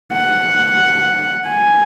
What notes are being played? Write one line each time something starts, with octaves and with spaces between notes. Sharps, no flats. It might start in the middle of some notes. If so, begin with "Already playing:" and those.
F#5
G#5